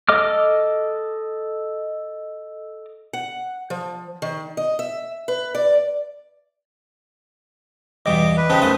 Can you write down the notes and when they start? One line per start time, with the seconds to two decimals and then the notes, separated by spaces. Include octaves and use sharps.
0.09 A4 D#5 D6 F6
3.13 F#5
3.70 F3
4.22 D#3
4.57 D#5
4.79 E5
5.28 B4
5.55 D5
8.06 E2 G2 B2 D#5 D6
8.37 B4
8.50 C#3 C#4 D#4 G4 C5 A5
8.62 F#2 A3 D#6